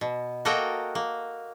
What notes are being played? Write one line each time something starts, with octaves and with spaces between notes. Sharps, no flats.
B2
A#3 F#4 A4 A#4 D#5 G5
A#3